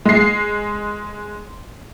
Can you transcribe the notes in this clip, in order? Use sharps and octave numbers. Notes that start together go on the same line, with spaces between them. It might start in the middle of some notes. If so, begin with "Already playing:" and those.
G#3 C7